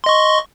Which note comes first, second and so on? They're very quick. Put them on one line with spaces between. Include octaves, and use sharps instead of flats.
C6 D#5 C#6